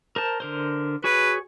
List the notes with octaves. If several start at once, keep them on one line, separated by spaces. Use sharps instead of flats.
A#4 C5 A5
D3 A#4 C5
F#4 G#4 B4 C#5